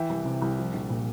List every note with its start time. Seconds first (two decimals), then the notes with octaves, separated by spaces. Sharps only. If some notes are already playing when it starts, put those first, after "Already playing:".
Already playing: E3 E5 G5
0.09 C2
0.25 C3
0.42 C2
0.58 F3
0.74 A#1
0.90 A#2